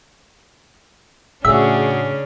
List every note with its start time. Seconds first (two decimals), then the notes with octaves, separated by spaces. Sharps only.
1.45 A2 C#3 A3 C#4 D4 F#4 G#4 E5